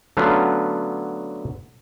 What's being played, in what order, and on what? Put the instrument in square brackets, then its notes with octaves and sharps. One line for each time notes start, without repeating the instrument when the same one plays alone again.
[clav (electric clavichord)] D3 F#3 A3 B3 C#4 F4